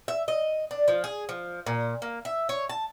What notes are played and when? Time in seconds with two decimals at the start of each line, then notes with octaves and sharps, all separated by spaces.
0.08 E5
0.28 D#5
0.71 D4
0.88 F3
1.04 G#4
1.29 F3
1.66 A#2
2.02 A#3
2.25 E5
2.49 C#5
2.69 A5